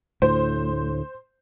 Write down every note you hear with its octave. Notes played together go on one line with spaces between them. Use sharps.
D2 A2 C5